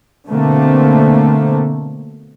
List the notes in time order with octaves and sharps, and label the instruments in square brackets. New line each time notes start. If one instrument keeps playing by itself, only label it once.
[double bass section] B2 D3 A3 A#3 C4